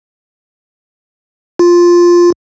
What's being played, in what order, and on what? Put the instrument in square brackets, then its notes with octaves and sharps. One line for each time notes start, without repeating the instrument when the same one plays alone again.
[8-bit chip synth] F4